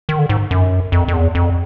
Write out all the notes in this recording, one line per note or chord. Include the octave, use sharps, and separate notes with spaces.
D#3
D3
G#2
F#2
F2
F2
E2
F2